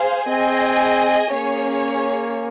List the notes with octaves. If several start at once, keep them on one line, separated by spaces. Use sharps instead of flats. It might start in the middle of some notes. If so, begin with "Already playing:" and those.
Already playing: G#4 C5 F5
C4 G#4 D#5 G#5
A#3 C#4 G#4 C#5